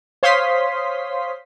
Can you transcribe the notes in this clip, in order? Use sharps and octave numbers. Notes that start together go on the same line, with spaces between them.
C5 C#5 F5 C6 D#6 B6